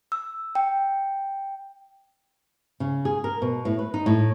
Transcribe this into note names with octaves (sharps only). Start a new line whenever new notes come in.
E6
G5
C#3
G#4
A#4
B2
A2
B4
D#4
A2